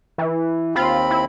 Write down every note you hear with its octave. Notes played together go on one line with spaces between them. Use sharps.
E3
D#2 C4 F4 B5
E4